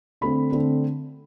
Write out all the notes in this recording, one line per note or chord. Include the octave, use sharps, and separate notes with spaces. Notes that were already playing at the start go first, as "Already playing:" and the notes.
D3 A3 C4 B5
D3 A3 C4